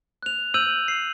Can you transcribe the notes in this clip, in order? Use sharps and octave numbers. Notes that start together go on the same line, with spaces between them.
F#6 F7
E6 G6 D#7 F#7
C7